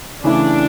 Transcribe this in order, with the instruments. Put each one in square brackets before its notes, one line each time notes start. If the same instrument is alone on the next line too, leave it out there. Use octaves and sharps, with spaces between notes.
[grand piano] C#3 E3 A3 E4 [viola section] D4